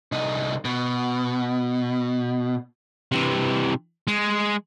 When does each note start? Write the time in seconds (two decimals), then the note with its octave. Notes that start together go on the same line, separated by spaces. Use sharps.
0.12 C2 D#4
0.65 B2
3.12 C3 E3
4.07 G#3